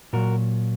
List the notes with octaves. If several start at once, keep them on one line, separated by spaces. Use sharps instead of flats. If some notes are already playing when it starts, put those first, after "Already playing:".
A#2 F#3 F#4 A#4